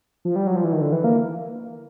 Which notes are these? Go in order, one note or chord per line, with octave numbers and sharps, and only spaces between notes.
F3
G3
F#3
F3
E3
D#3
D3
E3
A#3